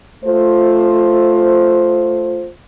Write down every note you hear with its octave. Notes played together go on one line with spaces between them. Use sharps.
A3 F4 C5